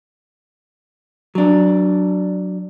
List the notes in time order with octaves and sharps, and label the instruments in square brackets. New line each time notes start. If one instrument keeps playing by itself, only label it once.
[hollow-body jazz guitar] F#3 D4